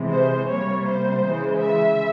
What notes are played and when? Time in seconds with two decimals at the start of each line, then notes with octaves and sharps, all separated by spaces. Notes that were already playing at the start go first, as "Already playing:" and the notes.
Already playing: C3 E3 G#3
0.10 C5
0.48 C3 G3 A#3 C#5
0.86 C5
1.25 C#3 E3 G#3
1.62 E5